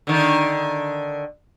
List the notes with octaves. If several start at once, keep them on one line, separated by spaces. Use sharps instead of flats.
D3 D#3